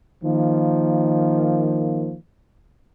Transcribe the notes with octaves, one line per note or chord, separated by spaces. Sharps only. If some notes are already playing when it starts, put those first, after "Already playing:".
D#3 F3 A#3